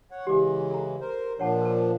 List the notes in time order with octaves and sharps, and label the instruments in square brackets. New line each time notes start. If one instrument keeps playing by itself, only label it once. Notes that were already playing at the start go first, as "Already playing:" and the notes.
[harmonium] C#5 F#5
[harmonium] C#3 E3 G#3 [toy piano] G4 D6
[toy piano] A4 A#5
[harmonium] A#4 C5
[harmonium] A#2 F3 D4 [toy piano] C#5 F#5 A5
[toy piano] A#4 B4 A5